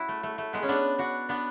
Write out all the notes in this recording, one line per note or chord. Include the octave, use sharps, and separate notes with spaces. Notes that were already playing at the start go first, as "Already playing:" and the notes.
Already playing: E4 F#4
A3
A3
A3
G#3 B3
C#4
B3 D4
D4 F#4
B3 D4